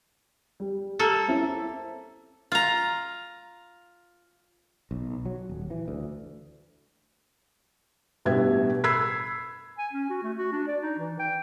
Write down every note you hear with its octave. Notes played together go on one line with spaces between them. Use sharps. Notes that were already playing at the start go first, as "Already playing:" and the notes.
G3
A#3 A4
C4 C#4 E4
F4 A#5
B1
F#3
D#1
E3
D2
A1 G2 B2 G4 E5 G#6
B5 E6 G#6 B6 C7
G#5
C#4
F#4
A3
F#4
D4
D5
D#4
E3
G5